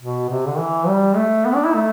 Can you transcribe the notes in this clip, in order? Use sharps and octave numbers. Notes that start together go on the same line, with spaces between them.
B2
C3
D3
E3
G3
A3
B3
D4
E4
A3